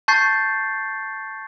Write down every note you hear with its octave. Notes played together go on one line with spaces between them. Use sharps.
A5 C#6 G6 A6 C7